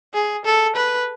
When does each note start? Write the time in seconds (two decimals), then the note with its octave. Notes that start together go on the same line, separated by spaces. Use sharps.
0.14 G#4
0.45 A4
0.76 B4